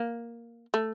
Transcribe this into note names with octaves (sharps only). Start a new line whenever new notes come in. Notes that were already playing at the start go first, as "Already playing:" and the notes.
Already playing: A#3
A3